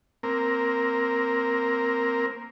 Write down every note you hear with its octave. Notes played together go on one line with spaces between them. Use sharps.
A#3 C4 A#4